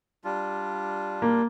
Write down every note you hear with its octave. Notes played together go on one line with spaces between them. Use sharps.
G3 D4 F4
A#3